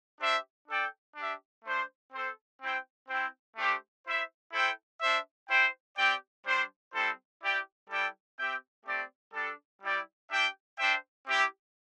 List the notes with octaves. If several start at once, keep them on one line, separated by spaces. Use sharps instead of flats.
D4 G4 C5 E5
D4 A4 D5 G5
D4 G4 E5
A3 D4 C5
C4 A4 C5
C4 E4 C5 G5
C4 E4 C5 G5
A3 D4 G4 C5
E4 C5 E5
E4 A4 C5 G5
D4 C5 E5
E4 C5 G5
C4 G4 D5 G5
G3 D4 C5
G3 C4 E4 A4 C5
E4 G4 D5 G5
G3 E4 A4 D5 G5
C4 G4 E5 G5
A3 C4 G4 D5
G3 D4 A4
G3 E4 G4 D5 G5
D4 G4 E5 G5
D4 C5 E5 G5
C4 E4 G4 E5